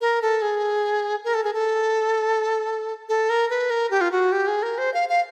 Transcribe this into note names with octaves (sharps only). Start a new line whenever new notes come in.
A#4
A4
G#4
A#4
A4
G#4
A4
A4
A#4
B4
A#4
G4
F4
F#4
G4
G#4
A#4
C5
F5
F5